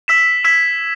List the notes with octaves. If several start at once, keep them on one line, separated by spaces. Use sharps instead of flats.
E6 B6 E7
E6 G#6 B6 E7